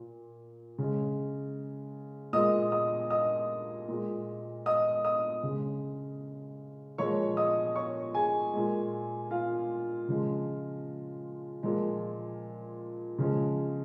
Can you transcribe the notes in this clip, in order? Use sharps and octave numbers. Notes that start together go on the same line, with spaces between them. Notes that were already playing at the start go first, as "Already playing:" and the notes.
Already playing: A#2
C#3 G#3
A#2 G#3 D#5 D#6
D#5 D#6
D#5 D#6
A#2 G#3
D#5 D#6
D#5 D#6
C#3 G#3
A#2 F3 G#3 C#5 C#6
D#5 D#6
C#5 C#6
G#4 G#5
A#2 G#3
F4 F5
C#3 F3 G#3
A#2 F3 G#3
C#3 F3 G#3